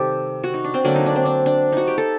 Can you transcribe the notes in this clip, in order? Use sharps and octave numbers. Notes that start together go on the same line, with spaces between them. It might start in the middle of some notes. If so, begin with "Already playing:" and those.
Already playing: C3 D#3 G3 G4 A4
F#4
D#4
D4
C4
D3 F#3 A#3 D4
D#4
D4
C4
D4
D4
D#4 F#4
G4
A4